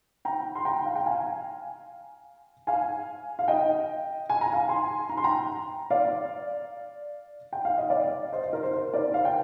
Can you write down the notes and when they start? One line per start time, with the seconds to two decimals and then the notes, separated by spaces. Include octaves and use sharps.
0.25 G5 A#5
0.55 C6
0.65 G5 A#5
0.85 F5
0.96 G5
1.06 F5 G#5
2.67 F5 G#5
3.39 F5
3.48 D#5 G5
4.30 G#5
4.41 A#5
4.52 F5 G#5
4.69 G#5 C6
5.09 A#5
5.17 C6
5.24 G5 A#5
5.90 D5 F5
7.53 G5
7.65 F5
7.78 D#5
7.90 D5 F5
8.32 C5 D#5
8.43 C5
8.53 A#4
8.63 C5
8.73 C5
8.93 A#4 D5
9.14 F5
9.25 G5